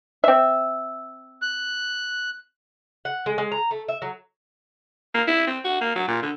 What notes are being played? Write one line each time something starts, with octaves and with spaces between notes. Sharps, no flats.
C4 E5
F#6
F#5
G#3
G#3
A#5
A3
E5
F#3
A#3
E4
C4
F#4
A#3
F#3
A#2
D3